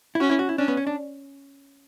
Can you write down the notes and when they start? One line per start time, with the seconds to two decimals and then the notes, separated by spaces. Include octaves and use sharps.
0.15 E4
0.20 C#4 F#4
0.29 E4
0.39 F#4
0.49 E4
0.58 C#4 D4
0.68 B3
0.77 C#4
0.87 D4